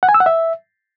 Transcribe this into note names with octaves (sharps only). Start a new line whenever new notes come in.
F#5
G#5
E6
F#5
E5